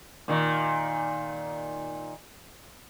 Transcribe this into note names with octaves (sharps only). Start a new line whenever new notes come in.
A#2 D#3